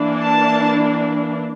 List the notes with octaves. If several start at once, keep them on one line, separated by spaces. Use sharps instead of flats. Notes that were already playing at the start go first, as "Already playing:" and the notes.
Already playing: E3 A#3 D4
A5